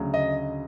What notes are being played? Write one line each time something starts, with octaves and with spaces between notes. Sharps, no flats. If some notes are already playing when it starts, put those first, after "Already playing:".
Already playing: D2 C#3 F#3
D#5